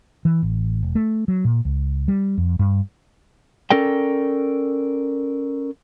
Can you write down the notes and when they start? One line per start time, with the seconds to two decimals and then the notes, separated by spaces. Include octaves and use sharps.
0.25 E3
0.43 A1
0.83 E1
0.95 A3
1.28 F#3
1.45 A#2
1.65 C#2
2.08 G3
2.38 F2
2.59 G2
3.70 C#4 A4 A#4 D5 G5